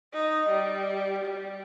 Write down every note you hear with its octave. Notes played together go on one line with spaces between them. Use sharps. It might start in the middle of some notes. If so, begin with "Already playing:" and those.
D#4
G3
G3